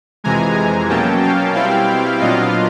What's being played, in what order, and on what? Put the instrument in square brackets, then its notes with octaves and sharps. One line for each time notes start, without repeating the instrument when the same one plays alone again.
[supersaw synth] F2 C3 E3 G#3 G#5 A#5
G#5 A#5
B2 F#3 A#3 C#4 G5 A5
F5 G5
B2 G3 C4 E4 F5 G5
A#2 F#3 B3 D4 F4 D#5 F5